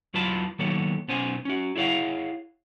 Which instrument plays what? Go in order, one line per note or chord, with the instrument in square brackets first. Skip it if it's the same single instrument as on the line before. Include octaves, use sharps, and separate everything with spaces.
[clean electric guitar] E2 F#3 F4 B4 A5 B5
D#3 F#3 A#3 B3 A4 C#5
B1 B3 C#4 C5 G#5
C#4 F#4
E4 G#4 C#5 F5 F#5